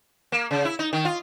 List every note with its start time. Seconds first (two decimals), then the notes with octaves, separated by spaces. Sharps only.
0.32 A#3
0.51 C#3
0.65 E4
0.79 D#4
0.93 D#3
1.05 F4